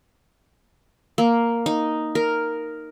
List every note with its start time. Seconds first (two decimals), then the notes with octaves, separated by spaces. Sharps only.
1.18 A#3
1.66 D#4
2.15 A#4